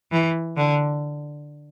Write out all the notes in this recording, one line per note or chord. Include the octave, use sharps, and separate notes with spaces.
E3
D3